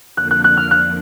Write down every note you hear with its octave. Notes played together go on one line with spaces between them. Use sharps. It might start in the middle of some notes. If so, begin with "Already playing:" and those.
F2 D3 F3 A#3 D4 F#6
F#6
F#6
F6
F#6